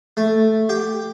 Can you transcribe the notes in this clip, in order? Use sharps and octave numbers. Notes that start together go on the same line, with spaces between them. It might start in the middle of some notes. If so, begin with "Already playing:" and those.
A3
G4 G5